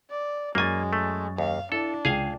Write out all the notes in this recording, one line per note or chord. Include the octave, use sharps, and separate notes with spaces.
D5
F#2 G#3 A#3 G#5 C#6 A6
A3
D#2 F5
D4 E4 A4
C#2 G#4 F5 G5 G#5